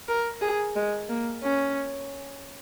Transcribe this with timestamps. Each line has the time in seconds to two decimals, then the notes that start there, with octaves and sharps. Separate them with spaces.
0.08 A#4
0.42 G#4
0.76 G#3
1.09 A#3
1.43 C#4